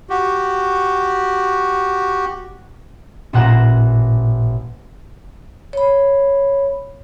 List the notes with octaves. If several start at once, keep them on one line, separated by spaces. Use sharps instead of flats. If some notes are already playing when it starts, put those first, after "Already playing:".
F#4 G4
A1 A#2 F#5 A#5 E7
C#5 B5